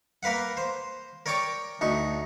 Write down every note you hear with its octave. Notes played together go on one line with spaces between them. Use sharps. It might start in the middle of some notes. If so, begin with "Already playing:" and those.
A#3 A#4 B4 F5 F#5
C5
A#4 C#5 D5 G5 C#6 D6
D2 D#4 C#6